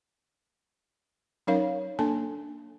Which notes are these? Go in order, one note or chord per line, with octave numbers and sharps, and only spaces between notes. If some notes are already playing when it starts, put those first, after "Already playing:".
F#3 C#4 D#4 A#4 C#5 F5
A#3 D4 A4 A5